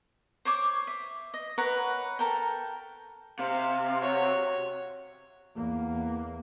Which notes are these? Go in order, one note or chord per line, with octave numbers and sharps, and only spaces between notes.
C5 C#5 D6
E5
D#5
A#4 B4 C#5 F#5
A4 A#4 G5
C3 F5
F#4 C#5
E2 A#3